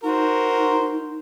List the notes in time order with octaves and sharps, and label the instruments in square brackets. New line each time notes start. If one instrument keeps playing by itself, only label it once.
[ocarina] D#4 [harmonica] F#4 A#4 C5